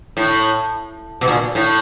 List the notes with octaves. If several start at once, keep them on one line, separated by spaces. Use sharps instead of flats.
A2
B2
A#2
A2